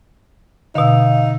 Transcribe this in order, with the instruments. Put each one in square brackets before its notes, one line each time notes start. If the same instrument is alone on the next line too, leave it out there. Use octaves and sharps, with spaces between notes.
[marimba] B2 D3 [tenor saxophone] D#4 [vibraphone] F5 E6